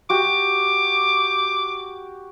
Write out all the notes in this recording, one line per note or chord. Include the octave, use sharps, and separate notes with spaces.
F#4 G4 D6